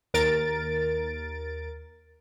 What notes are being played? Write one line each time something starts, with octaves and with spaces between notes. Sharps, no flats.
D#2 A#4 A6 D7